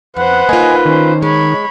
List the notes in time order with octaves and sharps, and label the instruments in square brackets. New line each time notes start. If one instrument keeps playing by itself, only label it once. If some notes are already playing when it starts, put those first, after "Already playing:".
[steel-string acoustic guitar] F2 [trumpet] B4 [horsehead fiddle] C5 F#5
[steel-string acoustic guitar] A#3 D#4 F4 [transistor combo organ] D#5 G#5
[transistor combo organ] D#3 [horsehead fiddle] C#4 C5
[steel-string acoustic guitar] G#3 [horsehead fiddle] C#5 B5